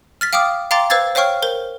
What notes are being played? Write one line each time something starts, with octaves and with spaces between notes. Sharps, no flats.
F6 A6 B6
F5 G5 D6 D#6 F6
F5 G5 A#5 C6 D6 A6
B4 C5 F5 E6 G#6 A6
C5 C#5 F5 G5 C#6 F6
A#4 C5 G7